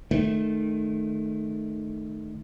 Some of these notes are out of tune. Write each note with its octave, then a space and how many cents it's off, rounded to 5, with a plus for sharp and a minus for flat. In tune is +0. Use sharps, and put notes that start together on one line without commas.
D#3 -25 A3 -20